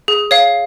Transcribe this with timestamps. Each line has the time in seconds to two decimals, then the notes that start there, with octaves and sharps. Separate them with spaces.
0.08 G#4
0.31 C#5 F5